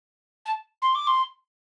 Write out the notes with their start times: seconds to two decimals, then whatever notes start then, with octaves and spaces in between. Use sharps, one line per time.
0.45 A5
0.82 C6
0.95 D6
1.07 C6